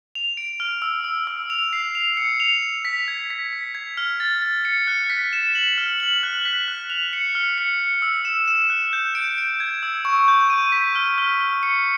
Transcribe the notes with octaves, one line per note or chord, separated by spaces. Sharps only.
F7
D7
F6
E6
E6
E6
F7
C7
F7
C#7
F7
F7
B6
G#6
B6
B6
G#6
F6
A6
A6
C#7
F#6
B6
E7
F#7
F6
F#7
F#6
B6
F#6
F7
C#7
F6
C#7
C#7
E6
E7
E7
F#6
G6
D7
D7
G#6
E6
C#6
G6
D#7
B6
F6
F6
F6
C#7